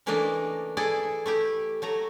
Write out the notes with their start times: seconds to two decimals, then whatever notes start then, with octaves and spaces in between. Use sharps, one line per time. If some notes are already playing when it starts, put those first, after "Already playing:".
0.06 C#3 E3 A3 A#3 D4 D#5
0.77 E4 G#4 A4 D5
1.26 A3 E4 G4
1.82 F#3 A3 A#5